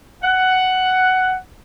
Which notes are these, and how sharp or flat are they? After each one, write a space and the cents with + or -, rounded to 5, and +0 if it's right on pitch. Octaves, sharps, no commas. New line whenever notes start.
F#5 +10